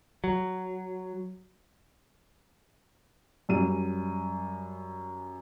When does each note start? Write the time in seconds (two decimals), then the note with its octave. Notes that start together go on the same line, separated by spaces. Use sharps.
0.24 F#3
3.49 F#2 G3 D#7